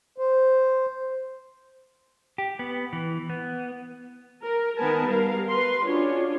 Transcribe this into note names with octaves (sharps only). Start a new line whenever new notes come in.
C5
G4
B3
E3
B3
A#4
D#3 B3 A#4 B4 G#5 A5
G3 A#4 F5
B4 C6
C#4 D4 F4 F#4 G#4 C#5